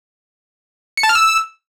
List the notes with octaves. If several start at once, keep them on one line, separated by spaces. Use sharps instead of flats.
C#7
A5
F6
E6